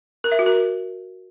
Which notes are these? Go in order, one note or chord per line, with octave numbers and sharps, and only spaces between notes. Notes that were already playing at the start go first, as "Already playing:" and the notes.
A#4
E5
F#4
A#4